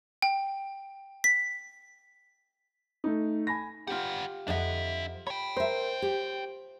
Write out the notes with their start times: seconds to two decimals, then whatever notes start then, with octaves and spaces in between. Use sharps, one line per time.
0.22 G5
1.24 B6
3.04 A3 D#4
3.47 G#5 B5 A#6
3.87 G3 F4 G4 F#5
4.48 F2 D4 D#5 E5 F#5
5.27 C#5 G5 B5
5.57 A#4 C5 E5
6.02 G4